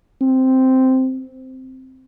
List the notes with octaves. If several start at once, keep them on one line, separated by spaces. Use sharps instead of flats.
C4